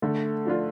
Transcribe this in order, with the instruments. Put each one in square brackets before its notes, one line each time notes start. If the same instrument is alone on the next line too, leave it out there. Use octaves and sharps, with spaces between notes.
[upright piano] D3 [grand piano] A3
[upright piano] F3 D4 F4